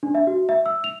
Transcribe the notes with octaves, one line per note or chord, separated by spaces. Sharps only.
D4
E5
F#4
E5
E6
F7